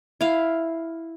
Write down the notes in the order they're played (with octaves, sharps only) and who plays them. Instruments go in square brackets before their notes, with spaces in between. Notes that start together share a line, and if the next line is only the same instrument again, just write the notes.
[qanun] E4 F5